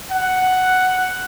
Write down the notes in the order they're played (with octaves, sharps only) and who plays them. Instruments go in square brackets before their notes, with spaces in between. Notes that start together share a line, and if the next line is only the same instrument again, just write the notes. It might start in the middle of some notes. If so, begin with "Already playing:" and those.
[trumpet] F#5